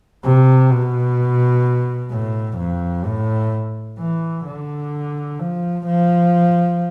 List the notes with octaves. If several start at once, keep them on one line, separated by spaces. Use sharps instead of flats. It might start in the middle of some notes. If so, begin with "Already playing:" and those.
C3
B2
A2
F2
A2
E3
D3
F3
F3